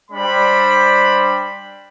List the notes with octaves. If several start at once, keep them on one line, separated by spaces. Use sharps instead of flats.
G3 D4 C5 B5